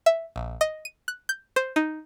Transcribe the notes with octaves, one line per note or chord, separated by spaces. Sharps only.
E5
A#1
D#5
D#7
F#6
G6
C5
D#4